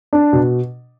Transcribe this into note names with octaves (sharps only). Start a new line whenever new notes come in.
D4
B2